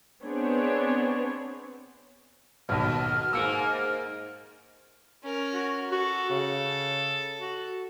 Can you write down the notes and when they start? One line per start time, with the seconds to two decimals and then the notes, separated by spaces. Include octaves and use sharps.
0.22 B3 C4 D4 G#4 C#5
2.69 D#1 B1 B2 F6
3.33 G#2 A#3 E6 C#7
5.23 C#4 A#4
5.53 F#4
5.92 F#4 A4
6.30 C#3
7.41 F#4